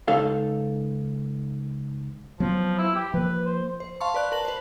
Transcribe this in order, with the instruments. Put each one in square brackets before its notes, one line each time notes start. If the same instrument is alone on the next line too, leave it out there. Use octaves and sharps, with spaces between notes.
[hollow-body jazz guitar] C#2 D#4 A4 F5
[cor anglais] F3 [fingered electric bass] F#3 B3
[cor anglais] E4
G4
[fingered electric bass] F3 A#3 [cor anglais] B4
[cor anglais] C5
[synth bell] C5
F5 A5 C6 C#6
B4 D5 F#6
A#4 A5 F#7
B4 C5